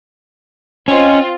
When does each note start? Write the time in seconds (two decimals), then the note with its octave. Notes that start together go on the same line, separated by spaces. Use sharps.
0.88 C4 C#4 F4 D#5